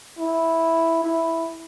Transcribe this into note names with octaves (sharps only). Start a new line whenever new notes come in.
E4
E4